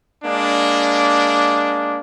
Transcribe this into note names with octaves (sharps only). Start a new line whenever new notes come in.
G#3 A#3 D4